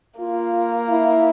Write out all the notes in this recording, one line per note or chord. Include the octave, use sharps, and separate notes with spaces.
A#3 F4
E4